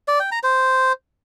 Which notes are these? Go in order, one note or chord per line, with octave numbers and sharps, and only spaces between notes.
D5
G5
A#5
C5